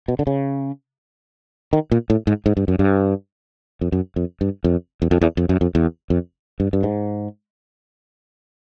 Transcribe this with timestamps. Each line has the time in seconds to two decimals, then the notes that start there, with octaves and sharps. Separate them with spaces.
0.08 B2
0.19 D3
0.27 C#3
1.73 D#3
1.91 A#2
2.10 A2
2.27 G#2
2.46 G#2
2.57 G2
2.68 F#2
2.79 G2
3.81 F2
3.92 F#2
4.16 F2
4.41 G2
4.64 F2
5.02 E2
5.11 F2
5.21 E2
5.37 F2
5.49 F#2
5.61 F2
5.75 E2
6.10 F2
6.60 G2
6.73 G2
6.83 G#2